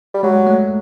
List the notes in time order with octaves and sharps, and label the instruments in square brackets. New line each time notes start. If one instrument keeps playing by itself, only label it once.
[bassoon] G3
[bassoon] F#3 [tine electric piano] G#3
[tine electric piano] A3